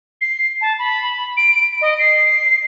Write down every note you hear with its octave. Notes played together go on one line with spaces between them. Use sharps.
C7
A5
B5
D7
D#5
C7